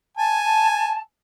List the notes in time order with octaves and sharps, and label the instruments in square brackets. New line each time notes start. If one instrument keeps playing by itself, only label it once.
[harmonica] G#5 [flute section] A5